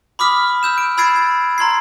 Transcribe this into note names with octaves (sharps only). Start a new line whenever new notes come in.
B5 D6 D#6 F6 B6
E6 G6 E7
D7
B5 E6 G#6 A6 C7 D7
G#6
A#5 C6 G#6 C7